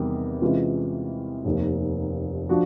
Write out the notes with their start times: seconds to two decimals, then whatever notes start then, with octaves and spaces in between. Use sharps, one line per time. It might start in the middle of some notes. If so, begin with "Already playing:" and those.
Already playing: E2 C3 D#3 G3
0.42 C3 E3 G#3 C#4 F4
1.45 F1 D#2 D#3
2.49 F3 D4 F#4